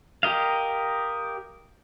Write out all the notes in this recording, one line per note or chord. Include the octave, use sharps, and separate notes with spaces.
G4 A#4 D#5 F5